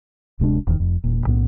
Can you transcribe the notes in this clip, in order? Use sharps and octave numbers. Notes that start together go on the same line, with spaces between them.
D1 C3 G#3 D4
E1 E2 A#2 D#3
F1 F2
E1 A#2
B1 A2 G3 B3